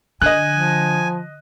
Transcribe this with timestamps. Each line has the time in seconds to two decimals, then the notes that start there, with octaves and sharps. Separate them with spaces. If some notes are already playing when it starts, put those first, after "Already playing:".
0.22 D3 D#5 G#5 F#6
0.52 F3